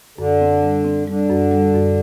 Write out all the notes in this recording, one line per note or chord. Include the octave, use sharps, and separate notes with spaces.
F#2 D3
C4
G3
C4
D3 G3
F#2
G3
F#2